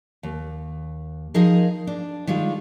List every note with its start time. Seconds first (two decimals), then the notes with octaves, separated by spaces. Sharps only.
0.23 D#2
1.34 F3 D#4 G#4 A#4 D#5
1.87 D4
2.27 D#3 G3 G#3 F4